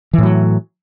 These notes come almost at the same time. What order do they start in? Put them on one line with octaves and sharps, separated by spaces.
E3 A2 F#3